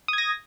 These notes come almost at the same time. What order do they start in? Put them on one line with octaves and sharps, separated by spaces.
D#6 G#6 A#6